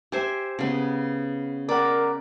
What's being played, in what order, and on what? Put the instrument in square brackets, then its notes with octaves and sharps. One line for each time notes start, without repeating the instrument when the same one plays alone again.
[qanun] G4 C5 E5 [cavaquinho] G#5
[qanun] C#3 B3
[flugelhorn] A#4 [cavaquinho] D5 F#5 [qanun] B5